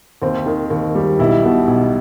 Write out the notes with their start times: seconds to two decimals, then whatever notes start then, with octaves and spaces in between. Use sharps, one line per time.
0.22 D#2 C4
0.46 D#3
0.70 D#2
0.95 G3
1.19 B1 E4
1.43 B2
1.67 B1